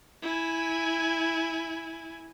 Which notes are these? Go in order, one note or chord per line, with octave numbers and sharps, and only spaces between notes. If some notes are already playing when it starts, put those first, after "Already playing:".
E4 G#5